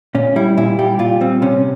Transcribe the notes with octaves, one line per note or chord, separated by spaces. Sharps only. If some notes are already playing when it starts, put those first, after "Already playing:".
A#2 C#4
G3 E4
A#2 E4
G3 G4
A#2 F4
G3 C4
C3 C#4